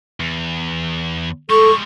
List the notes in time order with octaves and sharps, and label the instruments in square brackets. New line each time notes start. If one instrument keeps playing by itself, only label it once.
[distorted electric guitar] E2
[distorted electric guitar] G3 G#3 [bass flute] A4 [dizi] C#6